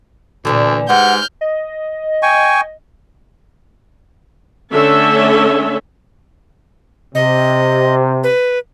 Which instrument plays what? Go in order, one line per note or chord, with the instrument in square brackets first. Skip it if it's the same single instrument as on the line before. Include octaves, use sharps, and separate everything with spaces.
[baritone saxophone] D2 [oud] A#2 D3 E3
[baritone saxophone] G#2 [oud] G#3 G4 B4 [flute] F#5 [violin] F6 G6
[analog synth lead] D#5
[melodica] G5 G#5 C#6
[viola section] D3 A3 C#4 A4 E5
[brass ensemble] C3 [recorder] D#5
[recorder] B4